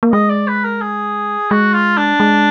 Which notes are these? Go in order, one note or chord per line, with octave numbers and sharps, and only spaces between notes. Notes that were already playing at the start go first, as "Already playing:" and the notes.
A#3
G#3 D#5
D5
B4
A#4
G#4
G#3 F#4
F4
D4
G#3